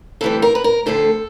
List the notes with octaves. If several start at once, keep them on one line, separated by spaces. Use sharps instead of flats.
D2 C3 E3 G3 A4
A#4
B4
A#4
D2 D3 F3 A3 C4 A4